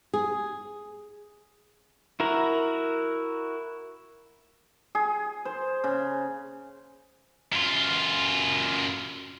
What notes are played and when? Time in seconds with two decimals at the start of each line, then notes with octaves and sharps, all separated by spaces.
0.14 G#4
2.20 E4 F#4 A#4 A#5
4.95 G#4
5.45 C5
5.84 C#3
7.53 F#2 F4